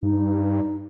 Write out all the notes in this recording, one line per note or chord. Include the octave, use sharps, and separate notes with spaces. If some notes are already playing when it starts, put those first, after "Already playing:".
G2 D#4